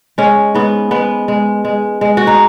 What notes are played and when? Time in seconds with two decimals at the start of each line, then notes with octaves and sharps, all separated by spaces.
0.18 G#3 C#4
0.55 G#2 B3
0.91 G#3 B3
1.28 G#3
1.65 G#3
2.01 G#3
2.17 F#4
2.27 D#4